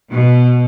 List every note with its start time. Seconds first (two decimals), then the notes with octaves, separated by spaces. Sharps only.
0.11 B2